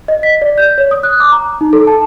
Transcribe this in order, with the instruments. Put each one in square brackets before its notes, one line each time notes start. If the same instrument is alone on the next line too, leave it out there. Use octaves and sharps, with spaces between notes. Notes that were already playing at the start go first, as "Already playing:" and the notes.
[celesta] D#5
B6
D5
G6
C#5
D#6
F#6
D6
A#5
D#4
A4
A5